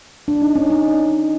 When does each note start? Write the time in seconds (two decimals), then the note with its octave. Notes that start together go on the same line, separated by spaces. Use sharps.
0.28 D4
0.42 D#4
0.55 C#4
0.70 D#4